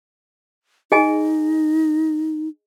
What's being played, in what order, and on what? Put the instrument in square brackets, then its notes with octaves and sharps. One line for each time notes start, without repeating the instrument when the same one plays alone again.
[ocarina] D#4 [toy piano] G#4 D#5 G#5